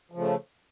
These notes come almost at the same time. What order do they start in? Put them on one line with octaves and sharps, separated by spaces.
F3 C#3 A3